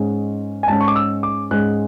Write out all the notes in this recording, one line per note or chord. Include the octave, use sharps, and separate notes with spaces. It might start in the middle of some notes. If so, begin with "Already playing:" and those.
Already playing: G#2 G#3 C#4
G#5
G#2 G#3 C#4 A5
C#6
D6
E6
D6
G#2 G#3 C#4 F#6